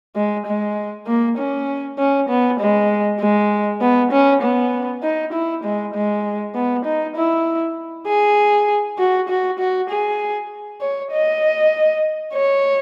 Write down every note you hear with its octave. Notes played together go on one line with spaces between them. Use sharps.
G#3
G#3
A#3
C#4
C#4
B3
G#3
G#3
B3
C#4
B3
D#4
E4
G#3
G#3
B3
D#4
E4
G#4
F#4
F#4
F#4
G#4
C#5
D#5
C#5